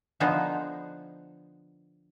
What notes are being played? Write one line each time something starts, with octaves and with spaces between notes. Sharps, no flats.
D3 F3 B3 D#4 G#4 C5